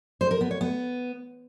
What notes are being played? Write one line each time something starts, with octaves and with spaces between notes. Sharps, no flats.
C5
A#4
B3
C#5
B3